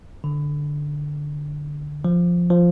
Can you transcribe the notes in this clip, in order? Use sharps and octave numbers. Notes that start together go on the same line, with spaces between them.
D3
F3
F3